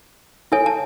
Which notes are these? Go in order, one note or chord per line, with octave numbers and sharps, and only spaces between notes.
E4 A4 C#5 G#5
A5